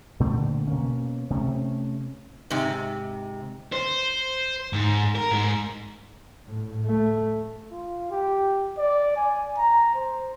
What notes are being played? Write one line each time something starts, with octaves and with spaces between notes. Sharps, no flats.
A#2 D3 A3 C4
B2 A#3 C#4
C3 A3 C4 C#4
G#2 C3
C5
G#2
A#4
G#2
A2
A3
F4
G4
D5
G#5
A#5
C5